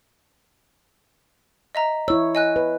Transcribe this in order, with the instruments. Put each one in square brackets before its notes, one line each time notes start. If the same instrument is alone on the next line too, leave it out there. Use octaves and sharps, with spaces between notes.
[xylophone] D#5 E5 A#5
[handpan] E4 C#5 [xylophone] E6
[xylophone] D#5 G#5 F#6
[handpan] B4